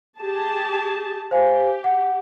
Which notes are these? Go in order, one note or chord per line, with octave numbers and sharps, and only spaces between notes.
G4 G#4 A5
G4 C5 F5 G#5
F#5